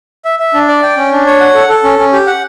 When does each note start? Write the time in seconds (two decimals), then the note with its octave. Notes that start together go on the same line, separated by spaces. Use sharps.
0.25 E5
0.39 E5
0.54 D4
0.68 D5
0.83 G5
0.97 C#4
1.12 D4
1.26 C#5
1.41 F#5
1.54 A4
1.69 A4
1.84 C#4
1.99 C#4
2.13 G4
2.27 F#5